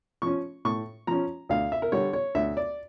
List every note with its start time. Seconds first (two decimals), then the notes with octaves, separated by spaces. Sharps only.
0.22 F3 C#4 C#6
0.65 A2 C#6
1.07 F3 C#4 A#5
1.49 D2 F5
1.72 E5
1.82 A#4
1.92 D3 G3 C#5
2.13 C#5
2.35 D2 E5
2.57 D5